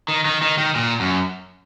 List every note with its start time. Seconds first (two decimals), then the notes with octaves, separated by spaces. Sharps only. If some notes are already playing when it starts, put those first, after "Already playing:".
0.08 D#3
0.25 D#3
0.42 D#3
0.58 D#3
0.75 A#2
1.00 F#2